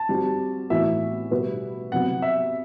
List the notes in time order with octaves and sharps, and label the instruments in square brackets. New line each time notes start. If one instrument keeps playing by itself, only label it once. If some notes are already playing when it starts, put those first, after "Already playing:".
Already playing: [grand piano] A5
[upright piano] G3 C4 F#4
[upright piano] A2 E3 B3 F#4 [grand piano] E5
[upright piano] B2 G3 B3 F#4 B4
[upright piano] C3 F#3 B3 [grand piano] F#5
[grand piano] E5